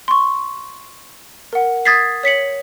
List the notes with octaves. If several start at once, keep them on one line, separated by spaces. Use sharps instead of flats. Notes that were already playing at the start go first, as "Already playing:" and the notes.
C6 C#6
A#4 F#5
D#6 G#6 A6 B6 C7
C#5 B6 C#7 F#7